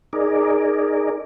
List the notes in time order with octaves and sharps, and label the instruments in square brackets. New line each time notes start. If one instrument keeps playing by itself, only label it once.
[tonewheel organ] D#4 G#4 A#4 D5